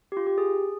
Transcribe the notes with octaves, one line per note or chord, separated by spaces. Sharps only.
G4
F4
G4
G#4